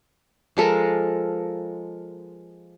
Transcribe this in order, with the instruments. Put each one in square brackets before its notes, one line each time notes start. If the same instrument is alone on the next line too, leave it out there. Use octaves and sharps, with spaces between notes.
[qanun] F3 G#3 A4 A#4